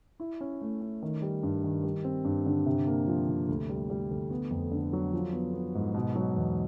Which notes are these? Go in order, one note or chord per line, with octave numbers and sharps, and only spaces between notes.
E4
C#4
A3
C#4
D#3
G3
G2
D#3
G3
C4
G2
D3
C3
A#3
F3
C3
D2
G3
G3
D2
B3
F2
D3
F#3
F3
B3
B3
G#2
B2
F#3
E2